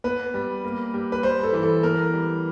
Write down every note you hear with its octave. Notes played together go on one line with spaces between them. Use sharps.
B3 B4
G3
A#3
G3
B4
G3 C5
A4
E3
A4
B3 A#4
G3